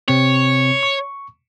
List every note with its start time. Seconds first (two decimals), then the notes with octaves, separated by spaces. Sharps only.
0.08 C3 C4 C#5
0.83 C#6